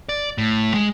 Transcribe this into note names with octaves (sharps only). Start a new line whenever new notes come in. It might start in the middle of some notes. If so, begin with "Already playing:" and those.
D5
A2
G#3